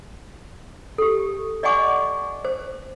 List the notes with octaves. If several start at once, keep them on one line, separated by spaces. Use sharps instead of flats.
G4 A4
D5 D#5 F#5 G#5 C#6 D6
C5